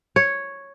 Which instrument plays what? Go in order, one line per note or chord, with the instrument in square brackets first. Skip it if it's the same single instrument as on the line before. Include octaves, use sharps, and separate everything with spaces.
[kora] C#5